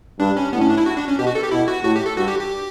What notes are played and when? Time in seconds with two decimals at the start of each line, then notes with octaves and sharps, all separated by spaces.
0.20 G2 D4
0.37 C#4
0.53 A2 B3
0.61 C#4
0.69 D4
0.78 E4
0.86 F#4
0.97 D4
1.08 C#4
1.19 B2 G4
1.27 F#4
1.35 A4
1.43 G4
1.51 B2 E4
1.68 F#4
1.84 A2 F#4
1.96 G4
2.06 A4
2.17 G2 F#4
2.28 G4
2.39 G4